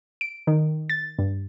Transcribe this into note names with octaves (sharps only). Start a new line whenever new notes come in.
D7
D#3
A6
G2